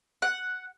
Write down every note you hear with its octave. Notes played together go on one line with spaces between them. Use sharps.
F#5